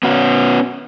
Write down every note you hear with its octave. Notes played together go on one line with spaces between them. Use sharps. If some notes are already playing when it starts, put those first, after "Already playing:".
B3 C#4 F#4